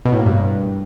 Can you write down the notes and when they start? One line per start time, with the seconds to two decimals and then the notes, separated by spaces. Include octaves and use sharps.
0.05 B2
0.12 A2
0.19 A#3
0.26 G2